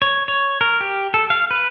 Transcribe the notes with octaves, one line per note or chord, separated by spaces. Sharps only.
C#5
C#5
A#4
G4
A4
F5
B4